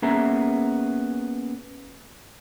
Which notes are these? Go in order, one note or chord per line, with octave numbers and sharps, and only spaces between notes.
A#3 B3 C#4 G#4 E5 A#5